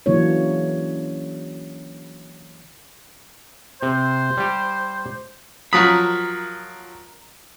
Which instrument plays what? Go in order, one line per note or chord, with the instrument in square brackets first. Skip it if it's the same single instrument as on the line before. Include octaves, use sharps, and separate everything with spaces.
[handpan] C#3 E3 F#3 A#3 D4 C#5
[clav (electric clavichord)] C3 [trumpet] C5
[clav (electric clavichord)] G3 G4
[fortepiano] F3 F#3 D#6 [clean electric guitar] A#4 B5